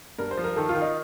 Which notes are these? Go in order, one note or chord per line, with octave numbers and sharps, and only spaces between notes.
G2 A#4
C5
F3
A#4
D#3 A4
F4
D#3
D#4